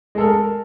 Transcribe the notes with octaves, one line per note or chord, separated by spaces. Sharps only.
G#3 A4 A#4